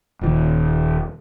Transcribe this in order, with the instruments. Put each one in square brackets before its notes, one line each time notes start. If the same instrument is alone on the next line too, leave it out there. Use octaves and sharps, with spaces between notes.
[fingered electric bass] D#1 D#3